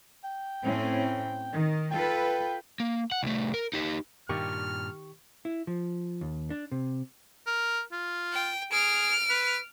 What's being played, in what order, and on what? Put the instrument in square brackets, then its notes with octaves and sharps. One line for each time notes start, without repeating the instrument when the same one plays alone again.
[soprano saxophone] G5
[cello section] A2 C4 C#4
D#3
[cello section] F4 A4 B4 [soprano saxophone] G5
[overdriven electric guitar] A#3
F#5
C2 A3
A#4
D#4 G4
[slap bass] G2 A#2 [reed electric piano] D#3 G4 C#6 [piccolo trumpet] F6
[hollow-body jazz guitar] E4
F3
D#2
D4
C3
[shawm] A#4
F4
[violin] G5
[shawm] G#4 [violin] F6 D7
[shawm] B4